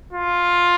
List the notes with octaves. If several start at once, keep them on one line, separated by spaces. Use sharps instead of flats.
F4